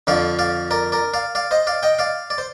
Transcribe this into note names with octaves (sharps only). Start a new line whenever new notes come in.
F2 D3 F3 D5 F5
D5 F5
A#4 D5
A#4 D5
D5 F5
D5 F5
C5 D#5
D5 F5
D#5 G5
D5 F5
D5
C5